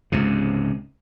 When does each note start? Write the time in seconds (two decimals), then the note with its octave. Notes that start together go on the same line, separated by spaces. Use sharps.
0.12 C#2 G#2 C3